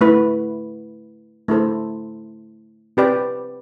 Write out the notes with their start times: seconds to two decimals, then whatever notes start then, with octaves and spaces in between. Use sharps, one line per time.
0.01 A3 E4 B4
1.48 A3 E4 A4 C5
2.97 C4 G4 B4 D5 G5